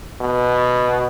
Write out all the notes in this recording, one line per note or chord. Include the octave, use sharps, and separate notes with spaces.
B2